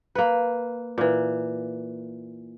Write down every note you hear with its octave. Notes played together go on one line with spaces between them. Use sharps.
A#3 B4
A#2 E3